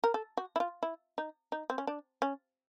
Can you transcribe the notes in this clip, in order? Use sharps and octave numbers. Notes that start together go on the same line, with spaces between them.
A#4
A4
F#4
E4
F4
E4
D#4
D#4
C4
C#4
D4
C#4